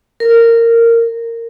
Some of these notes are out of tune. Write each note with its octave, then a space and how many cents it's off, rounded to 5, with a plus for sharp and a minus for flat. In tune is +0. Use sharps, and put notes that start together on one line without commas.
A#4 -15